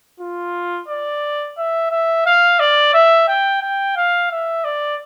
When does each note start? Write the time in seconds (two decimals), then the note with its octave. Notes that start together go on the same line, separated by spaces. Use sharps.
0.20 F4
0.88 D5
1.58 E5
1.91 E5
2.26 F5
2.60 D5
2.94 E5
3.28 G5
3.62 G5
3.96 F5
4.31 E5
4.64 D5